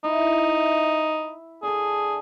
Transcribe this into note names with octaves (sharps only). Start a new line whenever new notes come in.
D#4 E4
E5
D3 G#4 A4